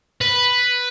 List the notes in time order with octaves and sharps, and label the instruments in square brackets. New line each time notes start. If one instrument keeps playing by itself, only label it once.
[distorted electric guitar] B4